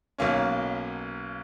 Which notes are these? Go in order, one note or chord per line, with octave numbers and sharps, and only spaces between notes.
B1 B2 A#3 C#4